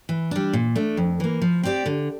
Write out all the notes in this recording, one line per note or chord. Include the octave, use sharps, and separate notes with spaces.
E3
G3 D4
A#2
A3 D4
F2
E3 A#3
F3
C4 G4 D5
D3